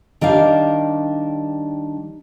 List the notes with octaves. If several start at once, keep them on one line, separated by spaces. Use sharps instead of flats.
D#3 G3 D4 F5